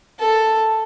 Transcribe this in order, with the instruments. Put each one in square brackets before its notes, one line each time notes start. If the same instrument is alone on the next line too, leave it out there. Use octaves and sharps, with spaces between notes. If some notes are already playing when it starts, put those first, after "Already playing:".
[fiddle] A4